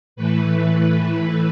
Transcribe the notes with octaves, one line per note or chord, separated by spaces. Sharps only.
A2 E3 A3 B4